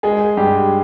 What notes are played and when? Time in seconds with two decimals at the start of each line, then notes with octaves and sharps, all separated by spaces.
0.03 G#3 G#4
0.37 G2 G4